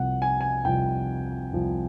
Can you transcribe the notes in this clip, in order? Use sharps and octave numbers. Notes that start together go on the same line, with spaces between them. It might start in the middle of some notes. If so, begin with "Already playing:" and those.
Already playing: C2 C3 F3 F#5
G#5
G#5
C2 C3 F3 G5
C2 C3 F3